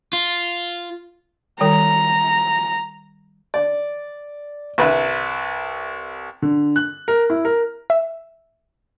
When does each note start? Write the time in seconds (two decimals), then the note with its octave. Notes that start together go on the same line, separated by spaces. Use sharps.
0.13 F4
1.60 D#3 G3 G5 A#5
3.54 D5
4.78 C2 B4 E5
6.42 D3
6.76 F#6
7.08 A#4
7.30 E4
7.45 A#4
7.90 E5